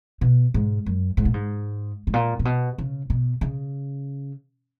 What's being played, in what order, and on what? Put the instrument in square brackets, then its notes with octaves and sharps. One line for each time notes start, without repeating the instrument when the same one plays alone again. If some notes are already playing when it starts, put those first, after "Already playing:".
[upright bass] B2
G#2
F#2
G#2
A#2
G#2
G#2
A#2
A#2
B2
C#3
B2
C#3